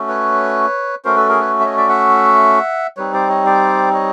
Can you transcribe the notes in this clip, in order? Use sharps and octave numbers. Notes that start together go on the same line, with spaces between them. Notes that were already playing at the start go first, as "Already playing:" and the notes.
Already playing: A3 C#4 F#4
B4 C#5
A3 C#4 F#4 A#4 C5
A4 B4
G#4 A#4
B4 C#5
E5
C#5 D#5
D5 E5
E5 F#5
G3 C4 D#4 B4 C#5
C5 D5
C#5 D#5
C5 D5
C#5 D#5